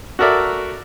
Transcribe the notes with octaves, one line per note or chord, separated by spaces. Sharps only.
F#4 A4 A#4 D5 E5